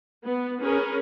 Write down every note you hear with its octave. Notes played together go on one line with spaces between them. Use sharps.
B3
C#4 G#4 A#4 B4